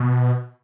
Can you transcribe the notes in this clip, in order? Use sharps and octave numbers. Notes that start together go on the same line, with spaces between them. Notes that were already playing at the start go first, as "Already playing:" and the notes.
Already playing: B2